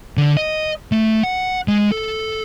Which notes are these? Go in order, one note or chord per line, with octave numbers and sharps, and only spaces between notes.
D3
D#5
A3
F#5
G#3
A4